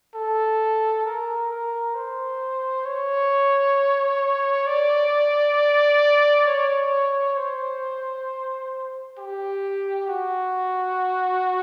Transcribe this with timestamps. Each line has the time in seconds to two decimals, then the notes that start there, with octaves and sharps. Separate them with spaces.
0.15 A4
1.06 A#4
1.51 A#4
1.95 C5
2.85 C#5
4.66 D5
6.46 C#5
7.37 C5
9.18 G4
10.08 F#4